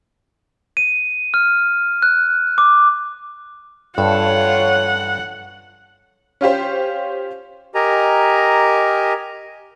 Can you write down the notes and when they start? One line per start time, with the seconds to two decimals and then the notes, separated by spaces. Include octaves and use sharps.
0.77 D#7
1.34 F6
2.02 F#6
2.58 D6
3.98 G2 F4 A4 C#5 F#5
6.41 C#4 F4 G4 C5
7.75 G4 A#4 D#5 G#5 A#5